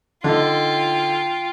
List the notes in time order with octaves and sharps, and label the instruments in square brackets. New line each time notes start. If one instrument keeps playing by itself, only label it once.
[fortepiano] D3 D#4 [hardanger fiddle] F4 G5